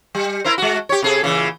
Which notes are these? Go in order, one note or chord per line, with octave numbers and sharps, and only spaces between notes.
G3
E4 A#4 C5
G#3 F#4
G4 C#5
C3 G#4 A4
A#2 C#3 E3